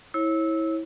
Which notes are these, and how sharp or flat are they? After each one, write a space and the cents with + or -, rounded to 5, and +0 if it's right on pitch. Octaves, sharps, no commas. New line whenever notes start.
E4 -20 C#5 -30